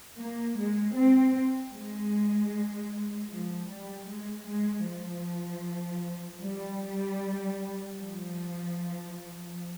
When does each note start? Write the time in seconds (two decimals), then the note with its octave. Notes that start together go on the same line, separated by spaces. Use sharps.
0.18 A#3
0.57 G#3
0.97 C4
1.74 G#3
3.30 F3
3.69 G3
4.09 G#3
4.48 G#3
4.86 F3
6.43 G3
7.99 F3